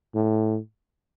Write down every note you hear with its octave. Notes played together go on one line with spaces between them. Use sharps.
A2